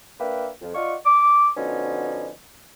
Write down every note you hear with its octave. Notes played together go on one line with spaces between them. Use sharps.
A#3 D4 A#4 B4 E5 G5
F2
F4 D5 D#5 F5 F#5 C#6
D6
D3 F3 B3 C#4 D#4 F#4